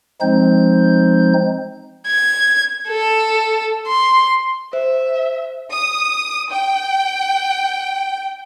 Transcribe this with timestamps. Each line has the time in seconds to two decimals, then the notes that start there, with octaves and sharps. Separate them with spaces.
0.21 F3 G#3 C4 D#4 G6
2.07 G#6
2.88 A4
3.88 C6
4.73 C5 E5
5.70 D#6
6.50 G5